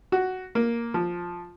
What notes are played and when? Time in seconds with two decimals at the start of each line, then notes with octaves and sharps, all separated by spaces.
0.12 F#4
0.55 A#3
0.94 F3